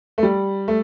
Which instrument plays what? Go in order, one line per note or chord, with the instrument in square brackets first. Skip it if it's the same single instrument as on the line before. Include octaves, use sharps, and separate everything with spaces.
[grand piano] A3
G3
A3